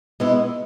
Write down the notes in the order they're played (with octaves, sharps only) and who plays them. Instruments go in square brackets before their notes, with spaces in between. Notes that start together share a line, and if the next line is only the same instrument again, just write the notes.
[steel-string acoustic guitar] B2 G#3 B3 E4